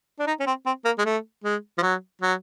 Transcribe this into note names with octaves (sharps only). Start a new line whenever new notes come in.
D4
D#4
C#4
C4
C4
A#3
G#3
A3
G#3
F3
F#3
F#3